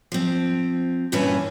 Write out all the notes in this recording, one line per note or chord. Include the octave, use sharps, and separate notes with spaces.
F3 C4
G2 A#2 E3 A#3 C#4 B4